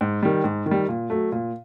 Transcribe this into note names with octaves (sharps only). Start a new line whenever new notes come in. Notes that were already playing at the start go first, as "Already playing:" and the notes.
G#2
D#3 G3
G#2
D#3
G3
A#2
F#3 A3
A#2